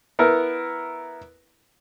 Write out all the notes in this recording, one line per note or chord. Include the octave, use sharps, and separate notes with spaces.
B3 E4 A#4